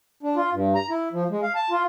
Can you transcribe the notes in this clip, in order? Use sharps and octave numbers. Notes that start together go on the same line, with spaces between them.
D4
F4
G2
A#5
E4
F3
G#3
F5
A5
F4